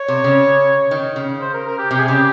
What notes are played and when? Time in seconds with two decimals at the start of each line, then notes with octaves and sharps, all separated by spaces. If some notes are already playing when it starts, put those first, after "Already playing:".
Already playing: C#5
0.08 C3
0.24 C#3
0.91 D#3
1.16 C#3
1.41 C5
1.54 A#4
1.67 A#4
1.79 G4
1.91 C3 G4
2.00 G#4
2.08 C#3 G4